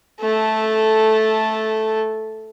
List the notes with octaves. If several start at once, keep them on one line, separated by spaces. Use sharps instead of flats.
A3 A4